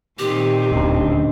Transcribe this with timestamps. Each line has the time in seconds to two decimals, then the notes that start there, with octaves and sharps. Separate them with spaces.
0.19 A#2 D#3 C4 G4
0.71 D1 D#2 C#4 D4 D#5